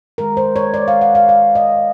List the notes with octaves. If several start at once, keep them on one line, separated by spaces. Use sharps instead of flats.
D#3 G#3 A#4
C5
C#5
D5
F5
F#5
F5
F5
D#5